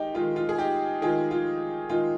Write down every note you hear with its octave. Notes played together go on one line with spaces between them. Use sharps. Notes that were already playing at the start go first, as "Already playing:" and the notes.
Already playing: D#3 G#3 D#4 G4
D#3 G#3 D#4 F4
F4
G#4
D#4 G4
D#3 G#3 D#4 F4 G#4
F4
D#3 G#3 D#4 F4